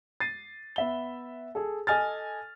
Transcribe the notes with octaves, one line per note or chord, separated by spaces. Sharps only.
A6 C7 D#7
B3 E5 G7
G#4 A4
A4 D#5 G#5 F6 A6